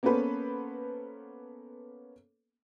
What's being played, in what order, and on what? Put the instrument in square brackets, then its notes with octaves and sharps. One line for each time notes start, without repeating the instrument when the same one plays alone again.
[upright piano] A#3 B3 C#4 A4 B4 C5